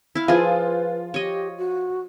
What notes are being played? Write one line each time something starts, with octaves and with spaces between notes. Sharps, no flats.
E4 F5
F3 F4 G#4 B4
G4 C#5 D#5
F#4